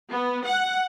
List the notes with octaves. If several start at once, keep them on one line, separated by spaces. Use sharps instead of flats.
B3
F#5